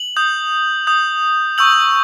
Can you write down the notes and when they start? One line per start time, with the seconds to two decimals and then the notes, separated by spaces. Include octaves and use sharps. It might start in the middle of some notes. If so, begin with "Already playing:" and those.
Already playing: F#7
0.17 D#6 G6
0.87 D#6 G6
1.58 C#6 E6 G6 F#7